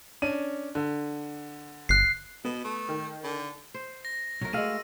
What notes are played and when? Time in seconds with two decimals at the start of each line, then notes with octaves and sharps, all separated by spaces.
0.22 C#4 D4 D#7
0.75 D3
1.89 G1 F#6 C7
2.45 B2 B3
2.64 A3
2.89 D#3
3.24 D3
3.74 C5
4.05 A#6
4.41 B1 F#3 F#4 A#4
4.53 G#3 A3 G#4 A#4 F5 E6 D#7